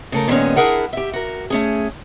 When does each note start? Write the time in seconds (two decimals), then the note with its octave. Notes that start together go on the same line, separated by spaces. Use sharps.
0.12 C#3 A3 A#4
0.28 A#2 D#3 G#3 B3 C#4
0.56 D4 E4 G#4 A#4 F#5
0.93 G4 E5
1.13 F#4 A#4
1.50 A3 C#4 G#4